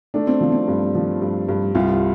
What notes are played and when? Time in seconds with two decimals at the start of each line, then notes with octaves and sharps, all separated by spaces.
0.14 A3 D4
0.27 C4
0.41 F3
0.52 C4
0.68 G2
0.95 F3
1.22 G2
1.48 G2
1.75 C2 F4